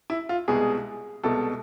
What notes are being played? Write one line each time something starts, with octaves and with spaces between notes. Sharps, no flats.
E4
F4
C2 B2 G#3 G#4
C2 B2 G#3 A4